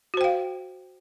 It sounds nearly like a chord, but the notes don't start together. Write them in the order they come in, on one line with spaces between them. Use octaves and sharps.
F#4 C5 G5 F5